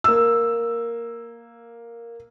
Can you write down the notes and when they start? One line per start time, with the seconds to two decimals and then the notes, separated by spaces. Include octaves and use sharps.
0.04 A#3 E6